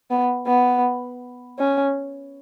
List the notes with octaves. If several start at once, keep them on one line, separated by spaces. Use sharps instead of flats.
B3
B3
C#4